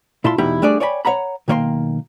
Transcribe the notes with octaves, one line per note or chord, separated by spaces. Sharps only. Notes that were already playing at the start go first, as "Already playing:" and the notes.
A#2 E4 F4 A5 B5 C6
E2 B2 D#4 E4 G4 B5
G3 A3 D4 G#4 D5
C#5 D5 G5 G#5 A#5 B5
C#5 E5 F#5 A#5 B5
B1 D#3 A#3 C#5 G5 C6